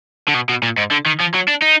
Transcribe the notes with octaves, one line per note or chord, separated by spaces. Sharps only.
D3
B2
B2
A#2
G#2
D3
D#3
F3
F#3
D4
D#4